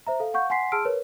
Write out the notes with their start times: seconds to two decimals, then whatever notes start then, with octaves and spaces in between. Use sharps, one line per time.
0.07 C5 E5 A#5
0.20 A4 F5
0.34 F5 F#5 C#6 G6
0.50 F#5 G#5 C6 B6 C7
0.72 G#4 A5 C6 E6 F6 D7
0.85 A#4 B4 C#5